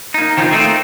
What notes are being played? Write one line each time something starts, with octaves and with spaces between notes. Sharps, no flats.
A#3 D#4
D#3 F3 B3 C4 D#4 F4
A3 A#3 C4 D#4 G#4 A4